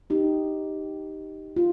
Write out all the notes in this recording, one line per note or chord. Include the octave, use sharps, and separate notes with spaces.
D#4 G4
F4